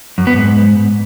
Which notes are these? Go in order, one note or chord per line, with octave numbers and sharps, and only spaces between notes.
F#2
B3
G#2